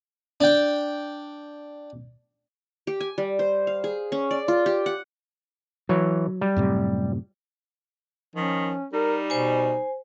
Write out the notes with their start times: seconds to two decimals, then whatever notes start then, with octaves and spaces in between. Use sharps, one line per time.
0.41 D4 G5
2.87 G4
3.00 G#5
3.18 G3
3.39 C5
3.67 F5
3.84 G#4
4.12 C#4
4.31 D5
4.48 F4
4.66 G4
4.86 F#5
5.89 E3 F#3 C#5
6.41 G3
6.56 F#2 A2 C3
8.36 D#3 F3 C#4
8.93 G3 D#4 A#4
9.30 B2 C5 G#5